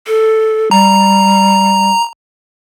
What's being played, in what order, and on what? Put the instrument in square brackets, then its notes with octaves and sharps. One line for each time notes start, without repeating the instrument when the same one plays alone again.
[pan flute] A4
[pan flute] G3 [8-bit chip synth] A#5